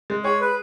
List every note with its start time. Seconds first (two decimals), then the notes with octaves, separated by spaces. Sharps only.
0.10 G#3
0.24 G#4 C#5
0.41 B4